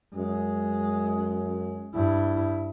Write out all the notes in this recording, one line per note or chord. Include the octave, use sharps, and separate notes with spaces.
F#2 G#3
G2 E4